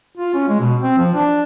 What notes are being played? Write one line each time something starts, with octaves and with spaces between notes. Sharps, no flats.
F4
C#4
G#3
B2
C4
F3
D4